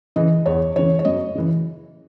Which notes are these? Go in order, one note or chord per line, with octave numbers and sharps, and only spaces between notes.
C#3 E3 D#5
E2 C#5
C#3 E3 C#5
C#5
F#2 D#5
C#3 E3